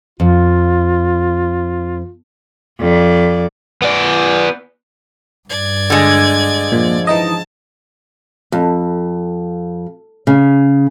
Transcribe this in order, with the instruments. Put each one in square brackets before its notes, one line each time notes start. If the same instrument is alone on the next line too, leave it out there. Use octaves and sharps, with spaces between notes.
[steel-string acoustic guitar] F2 [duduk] F4
[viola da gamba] F2 D5
[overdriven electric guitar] B3 D5
[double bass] G2 [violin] D5 G#6
[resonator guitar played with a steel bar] D3 G#3
[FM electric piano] A#2 [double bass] F3
[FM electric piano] E3 D#4 D#5 [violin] A5
[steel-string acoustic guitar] F2
C#3